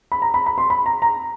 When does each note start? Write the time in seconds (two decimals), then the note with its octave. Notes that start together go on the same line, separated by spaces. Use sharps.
0.12 B5
0.22 A#5
0.34 B5
0.46 B5
0.58 C6
0.70 B5
0.86 A#5
1.02 A#5